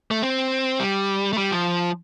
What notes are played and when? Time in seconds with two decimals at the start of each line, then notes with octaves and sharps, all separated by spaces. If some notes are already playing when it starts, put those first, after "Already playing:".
0.11 A3
0.22 C4
0.80 G3
1.33 A3
1.38 G3
1.52 F3